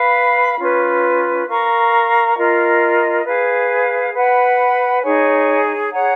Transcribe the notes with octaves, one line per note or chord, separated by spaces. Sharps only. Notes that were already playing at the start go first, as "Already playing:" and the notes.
Already playing: B4 F5 B5
C#4 F4 B4
A#4 F5 A#5 C#6
F4 A#4 D#5
G#4 B4 F5
B4 F#5 B5
D#4 G#4 C#5 G#5
G#4 C#5 F#5 A#5